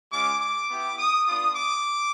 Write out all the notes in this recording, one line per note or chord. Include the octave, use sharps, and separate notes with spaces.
G#3 C#4 F4 D6
D6
B3 E4 G4
D#6
B3 D4 F4 D#6
D6